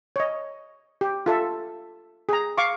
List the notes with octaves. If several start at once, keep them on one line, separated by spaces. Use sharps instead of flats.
C#5 D#5
G4
F4 A4 E5
G#4 A#5
F5 C#6 D6